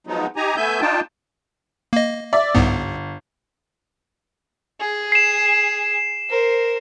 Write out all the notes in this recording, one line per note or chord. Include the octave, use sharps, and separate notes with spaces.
F3 F#3 G#3 B3 D#4
D#4 G4 G#5 A#5
A3 B3 E5 G#5 G6
D4 D#4 F4 G5 A5
A#3 D#5
D5 E5
G1 C2 G#2 B3
G#4
C7 E7
A#4 C5